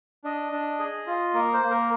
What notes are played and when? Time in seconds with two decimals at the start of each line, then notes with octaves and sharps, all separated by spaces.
0.24 D4 D#5
0.53 D4
0.79 G#4
1.07 F4
1.34 A#3 A#4
1.53 C5
1.62 A#3
1.70 A#4